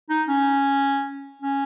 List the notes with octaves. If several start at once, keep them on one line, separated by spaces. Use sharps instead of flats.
D#4
C#4
C#4